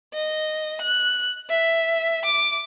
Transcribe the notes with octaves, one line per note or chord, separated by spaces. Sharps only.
D#5
F#6
E5
D6